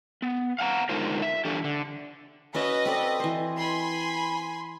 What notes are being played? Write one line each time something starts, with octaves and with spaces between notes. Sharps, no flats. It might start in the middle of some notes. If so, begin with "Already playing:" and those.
B3
F5 F#5 G#5 A#5
D3 G#3 D#4 F4 A#4 C5
E5
E3 D4 G4 A4
D3
C#4 F#4 B4 D#5 E5
C4 A4 D5
E3 C5
G#5 B5 C6